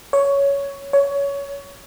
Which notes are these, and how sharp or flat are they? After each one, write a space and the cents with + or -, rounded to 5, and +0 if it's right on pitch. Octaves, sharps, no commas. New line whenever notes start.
C#5 +10
C#5 +20